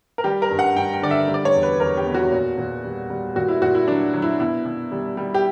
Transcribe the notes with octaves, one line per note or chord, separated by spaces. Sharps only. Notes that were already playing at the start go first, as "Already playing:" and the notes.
A#4
G3 G4
A#4
G2
F#5
G2 G5
G5
D3 D5
E5
G3
D5
C#5
E2
B4
E2 A#4
G4
B2
F#4
A#2
A#2
G3
G3
A#2 F#4
E4
A#2 F#4
E4
F#3 D4
F#3
E4
B2 E4
B2
G3
G3
G4